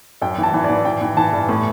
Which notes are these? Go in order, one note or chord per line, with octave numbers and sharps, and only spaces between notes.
F#2 G5
E3
A5
E3
D5
E3
E3 G5
E3
E3 A5
G2
A2